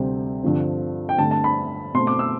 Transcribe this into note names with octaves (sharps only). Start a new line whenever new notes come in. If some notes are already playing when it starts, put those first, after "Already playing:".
Already playing: D2 C3 G3 C4
G2 D3 F3 C4
G5
G2 D3 A3 A5
A5
B5
B2 A3 C4 C6
D6
E6